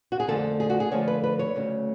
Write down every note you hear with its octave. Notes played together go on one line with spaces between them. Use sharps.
F#4
G#4
F2 D3 F3 A3 A4
G#4
F#4
G#4
F2 D3 F3 A3 C#5
B4
B4
C#5
D2 C#3 F#3 A3